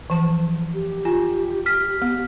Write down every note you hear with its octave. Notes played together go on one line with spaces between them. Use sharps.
E3 F3 A5
G4
F4 G#5
F6 B6
B3